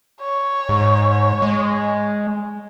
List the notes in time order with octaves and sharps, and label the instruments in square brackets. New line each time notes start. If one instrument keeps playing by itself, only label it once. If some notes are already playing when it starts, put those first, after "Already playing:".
[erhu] C#5
[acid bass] G#2
G#3